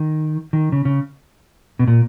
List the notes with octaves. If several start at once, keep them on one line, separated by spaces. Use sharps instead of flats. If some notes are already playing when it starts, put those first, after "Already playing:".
Already playing: D#3
D#3
C#3
C#3
B2
A#2